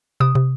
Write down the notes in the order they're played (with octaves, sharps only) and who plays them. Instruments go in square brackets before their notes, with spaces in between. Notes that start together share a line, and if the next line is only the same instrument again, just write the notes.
[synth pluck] C3 D#6
C3